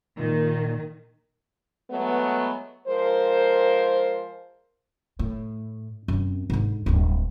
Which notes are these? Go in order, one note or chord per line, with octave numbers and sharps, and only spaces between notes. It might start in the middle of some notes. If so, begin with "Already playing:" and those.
A#2 D#3
F#3 G#3 A3 B3
F3 G#3 A#4 C5
A2
F#2 C4
G#2 D3
D1 G2